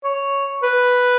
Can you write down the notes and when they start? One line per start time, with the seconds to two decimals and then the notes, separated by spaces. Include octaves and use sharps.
0.04 C#5
0.63 B4